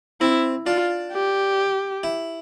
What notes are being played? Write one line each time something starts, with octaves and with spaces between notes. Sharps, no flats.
C4 E4
D4 F4
G4
E4